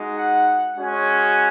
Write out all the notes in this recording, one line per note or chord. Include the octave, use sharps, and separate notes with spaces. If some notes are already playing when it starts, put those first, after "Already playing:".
Already playing: G#3 D#4 F#4
F#5
G#3 C#4 F#4 G#5